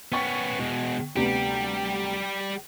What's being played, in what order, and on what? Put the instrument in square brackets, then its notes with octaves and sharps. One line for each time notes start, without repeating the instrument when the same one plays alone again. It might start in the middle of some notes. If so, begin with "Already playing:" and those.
[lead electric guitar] B3 C#4 [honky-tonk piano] G5 C#6 A6
[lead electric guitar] B2 G#3
[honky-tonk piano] D2 C3 B3 [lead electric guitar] G3 G4